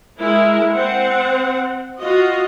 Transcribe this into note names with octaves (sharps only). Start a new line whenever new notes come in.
G#3 E4 A#4
C4 F#5
F4 F#4 D#5